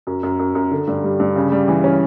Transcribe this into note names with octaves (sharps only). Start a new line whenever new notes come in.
F#2
F#2
F#2
F#2
D3
G2
G3
G2
C#3
G3
E3
C#4